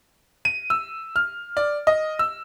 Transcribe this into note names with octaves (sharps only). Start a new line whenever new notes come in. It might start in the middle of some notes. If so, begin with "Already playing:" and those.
D#7
E6
F6
D5
D#5
E6